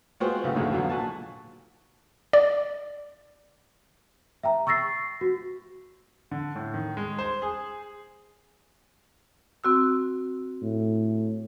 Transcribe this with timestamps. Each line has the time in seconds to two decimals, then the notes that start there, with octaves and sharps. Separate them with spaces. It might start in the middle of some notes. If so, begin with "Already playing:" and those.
0.20 G#3 B3 F4 F#4 C5 G5
0.44 B1 A2 C#3 A3
0.56 B1 E2 G#2 D3 G#3
0.72 F2 B2 D3 F#3
0.89 A#2 F#4 G#5 A5
2.33 D5
4.43 E5 G5 A#5
4.67 C#6 E6 A6 A#6 C7
5.21 F#4
6.31 D3
6.55 A2
6.74 D#3
6.97 G#3
7.18 C5
7.42 G#4
9.64 C4 F#4 E6
10.62 A2